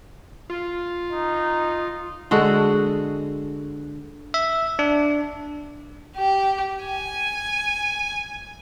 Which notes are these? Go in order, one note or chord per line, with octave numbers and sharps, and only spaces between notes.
F4
D#4
D3 G#3 F#4 A4
E5
D4
G4
G#5